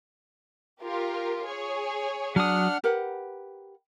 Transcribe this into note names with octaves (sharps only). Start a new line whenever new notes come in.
F4 G4 A#4
G#4 C#5
F#3 D4 F#5 D#6 F6
G4 A#4 B4 F#5